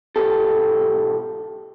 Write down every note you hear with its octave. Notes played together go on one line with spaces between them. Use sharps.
B1 G#2 G4 A4